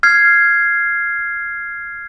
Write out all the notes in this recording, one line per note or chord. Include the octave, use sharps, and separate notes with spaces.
F6 G#6 C7